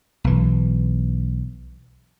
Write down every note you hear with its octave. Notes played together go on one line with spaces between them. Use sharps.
B1 E3